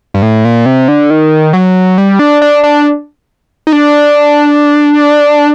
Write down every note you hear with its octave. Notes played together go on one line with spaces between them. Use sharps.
G2
A2
A#2
C3
D3
D#3
F#3
G3
D4
D4
D4
D#4
D4